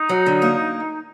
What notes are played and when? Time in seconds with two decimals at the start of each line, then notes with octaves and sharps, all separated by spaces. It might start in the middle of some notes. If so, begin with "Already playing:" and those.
Already playing: D#4
0.09 F#3
0.26 D3
0.42 A#3